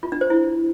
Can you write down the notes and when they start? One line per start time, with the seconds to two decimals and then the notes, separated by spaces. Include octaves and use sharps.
0.03 F4
0.12 D4
0.21 C5
0.30 E4